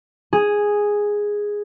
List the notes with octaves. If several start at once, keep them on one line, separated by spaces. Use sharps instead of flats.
G#4